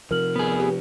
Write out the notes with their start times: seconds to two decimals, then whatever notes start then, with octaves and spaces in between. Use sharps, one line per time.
0.11 C3 F3 A#4 F6 F#7
0.36 B3 G#4
0.60 G4 B4